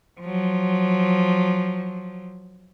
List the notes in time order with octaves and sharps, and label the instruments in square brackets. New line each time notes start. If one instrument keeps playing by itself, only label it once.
[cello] F3 F#3